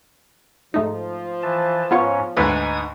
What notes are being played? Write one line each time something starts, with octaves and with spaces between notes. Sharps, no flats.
G#2 F3 A3 D#4
E3 A5
G#2 B3 C#4 F4 C#5
D2 G#2 D#4 B4 D#6 G#6